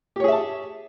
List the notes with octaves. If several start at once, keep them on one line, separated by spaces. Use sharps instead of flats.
G4 G#4 C#5 E5 A5